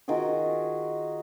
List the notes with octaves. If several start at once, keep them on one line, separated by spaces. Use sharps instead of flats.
D#3 F4 F#4 G#4